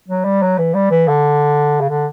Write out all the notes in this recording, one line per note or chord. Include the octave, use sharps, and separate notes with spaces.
F#3
G3
F#3
E3
G3
E3
D3
C#3
D3